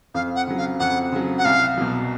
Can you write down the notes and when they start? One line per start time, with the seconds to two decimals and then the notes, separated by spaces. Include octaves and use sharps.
0.14 F2 F5
0.36 F#5
0.47 C#3 F#3
0.58 F5
0.80 F2 F#5
1.12 C#3 F#3
1.38 F#5
1.45 C2 F5
1.77 B2 F#3